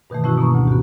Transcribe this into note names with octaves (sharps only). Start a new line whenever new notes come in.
G2 B2 D#3 E3 A3
A3 C#4 E4 F#4
B2 A#3 A#5 C#6
D2 G#2
B3 F#4 G4